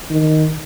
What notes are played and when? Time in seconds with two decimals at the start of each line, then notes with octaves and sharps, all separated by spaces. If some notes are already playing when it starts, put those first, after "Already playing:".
0.10 D#3